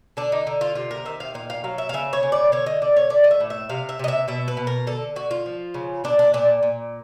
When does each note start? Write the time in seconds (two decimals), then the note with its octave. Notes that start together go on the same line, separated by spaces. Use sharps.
0.17 D3 D4
0.32 D#4
0.47 D3
0.61 F4
0.75 C3 F4
0.91 A#4
1.05 D#3 E5
1.20 F5
1.34 A#2 F5
1.50 F5
1.64 F#3 F5
1.78 E5
1.89 F5
1.94 C#3 E5
2.13 C#5
2.23 C#3
2.32 D5
2.52 D3 C#5
2.66 D#5
2.82 D3 D5
2.96 C#5
3.10 A3 D5
3.24 D#5
3.31 E5
3.40 A2
3.50 E5
3.69 C3 F5
3.89 E5
3.99 C3 D#5
4.08 E5
4.28 B2 E5
4.48 B4
4.57 B2
4.67 A#4
4.87 D3 A4
5.16 D3 F#4
5.31 F4
5.46 F3
5.74 C#3
6.04 A#2 D4
6.19 D4
6.34 A#2 D4
6.63 A#2